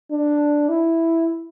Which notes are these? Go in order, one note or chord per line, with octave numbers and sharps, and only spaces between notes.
D4
E4